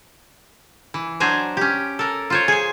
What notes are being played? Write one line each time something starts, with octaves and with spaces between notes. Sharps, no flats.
E3
F#3 D4 C5 G#5 A#5
C#4 G4
A4 A#4
F4 C5 C#5
G#4 G#5